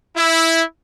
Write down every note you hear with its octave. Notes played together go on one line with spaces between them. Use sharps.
E4